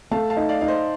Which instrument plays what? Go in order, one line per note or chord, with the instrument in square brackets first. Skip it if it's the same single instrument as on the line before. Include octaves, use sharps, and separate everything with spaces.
[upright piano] A3 [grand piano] F5 A5
[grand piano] F5 A5
[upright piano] D#4
[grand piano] D5 F5
[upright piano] D#4 [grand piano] F5
[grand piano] C5 D#5